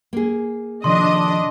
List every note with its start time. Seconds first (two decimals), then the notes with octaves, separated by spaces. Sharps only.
0.13 A#3 G#4
0.84 C3 D#3 F3 D4 D#5 C6